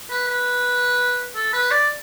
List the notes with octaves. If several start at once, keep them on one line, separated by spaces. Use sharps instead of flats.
B4
B4
A4
B4
D5